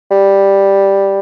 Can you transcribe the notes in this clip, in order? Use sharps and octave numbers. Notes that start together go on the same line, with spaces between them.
G3